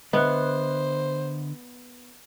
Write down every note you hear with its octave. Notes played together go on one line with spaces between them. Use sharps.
D3 B3 C5 D#5 E5 F#6